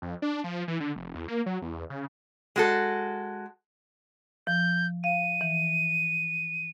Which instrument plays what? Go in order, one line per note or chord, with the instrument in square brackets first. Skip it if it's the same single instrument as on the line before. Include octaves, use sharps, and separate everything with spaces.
[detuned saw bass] F2
D4
F3
E3
D3
F1
E2
A#3
F#3
E2
C#3
[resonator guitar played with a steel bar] G#3 F#4 A4
[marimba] F3 [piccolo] G6
[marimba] F5 [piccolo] D#7
[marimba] E3